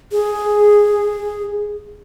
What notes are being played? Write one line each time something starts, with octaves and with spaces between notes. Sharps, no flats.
G#4